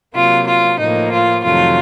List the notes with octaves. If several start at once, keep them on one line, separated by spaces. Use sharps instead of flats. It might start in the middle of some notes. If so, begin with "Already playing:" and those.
C3 F#3 A#3 F4
F4
A2 F3 A#3 D#4
F4
F2 C3 D#3 F#3 A3 F4